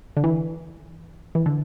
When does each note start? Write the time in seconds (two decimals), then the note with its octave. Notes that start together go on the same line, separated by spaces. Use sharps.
0.17 D3
0.24 E3
1.35 E3
1.46 D3